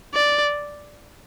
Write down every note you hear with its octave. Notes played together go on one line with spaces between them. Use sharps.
D5